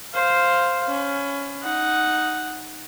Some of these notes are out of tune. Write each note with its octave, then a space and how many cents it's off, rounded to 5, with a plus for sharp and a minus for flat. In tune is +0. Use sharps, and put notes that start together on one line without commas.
C5 +0 F5 +0
C#4 +10 B5 +30
D#4 +0 F#5 +0